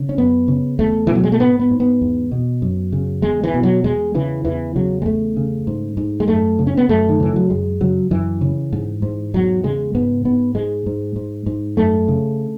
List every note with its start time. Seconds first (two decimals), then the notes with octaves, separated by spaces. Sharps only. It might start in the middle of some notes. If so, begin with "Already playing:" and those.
Already playing: C#3
0.09 C#4
0.18 F#2 B3
0.48 C#3
0.79 E2 A3
1.07 B2 E3
1.15 F#3
1.24 G#3
1.32 A3
1.39 G#2 B3
1.60 B3
1.71 G#2
1.80 B3
2.01 E2
2.32 B2
2.62 F#2
2.92 C#3
3.22 E2 G#3
3.44 E3
3.54 B2
3.63 F#3
3.84 E2 G#3
4.15 C#3 E3
4.45 E2 E3
4.76 C#3 F#3
5.02 G#3
5.05 E2 A3
5.37 C#3
5.67 G#2
5.97 G#2
6.20 G#3
6.28 F#2 A3
6.59 C#3
6.67 C#4
6.77 B3
6.89 F#2 A3
7.09 D#3
7.20 C#3 E3
7.36 F#3
7.50 F#2 G#3
7.81 C#3 F#3
8.11 F#2 E3
8.41 C#3
8.72 G#2
9.02 G#2
9.34 E2 F#3
9.63 C#3 G#3
9.95 G#2 B3
10.25 G#2 B3
10.55 G#2 G#3
10.86 G#2
11.16 G#2
11.46 G#2
11.77 F#2 A3
12.08 C#3